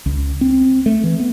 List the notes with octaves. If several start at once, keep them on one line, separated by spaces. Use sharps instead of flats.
C#2
C4
A3
E3
B3